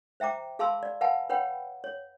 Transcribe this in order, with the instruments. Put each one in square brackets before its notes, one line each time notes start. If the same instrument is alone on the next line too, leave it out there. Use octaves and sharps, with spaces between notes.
[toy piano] C5 E5 G5 A#5 D6
G#4 F5 A5 B5 C6 E6
D5
B4 F5 F#5 G#5 A5 B5
B4 C#5 F#5 G5 B5
C#5